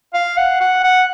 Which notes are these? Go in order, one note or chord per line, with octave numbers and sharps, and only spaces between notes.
F5
F#5
F#5
F#5